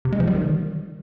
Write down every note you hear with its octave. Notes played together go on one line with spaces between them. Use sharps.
C3
G#3
F3
G3
D#3